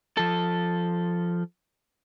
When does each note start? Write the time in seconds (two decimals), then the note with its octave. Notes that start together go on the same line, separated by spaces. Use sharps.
0.17 F3 A4